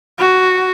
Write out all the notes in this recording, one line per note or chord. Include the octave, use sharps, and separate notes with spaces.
F#4